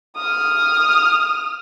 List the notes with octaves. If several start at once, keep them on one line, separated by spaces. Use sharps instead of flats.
D#6 F6